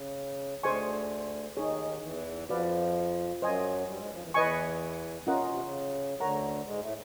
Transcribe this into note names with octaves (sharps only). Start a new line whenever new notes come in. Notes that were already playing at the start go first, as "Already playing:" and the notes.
Already playing: C#3
D2 D3 G#4 C5 D#5 G#5 C#6
D#2 D#3 D#4 G#4 C#5
E2 E3
F2 F3 F#4 B4 D5 F5
F#2 F#3 C5 D#5 G#5
G2 G3
G#2 G#3
F2 F3
E2 E3
E2 E3 B4 D#5 G#5 C#6
C3 C#4 F4 A#4 D#5 F#5
B2
C3
C#3
D2 D3 A#4 C#5 F#5 A#5
G#2 G#3
A2 A3